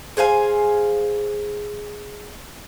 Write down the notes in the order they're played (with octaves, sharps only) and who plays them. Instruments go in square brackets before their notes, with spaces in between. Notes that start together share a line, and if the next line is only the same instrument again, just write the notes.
[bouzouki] G#4 C5 F5 G#5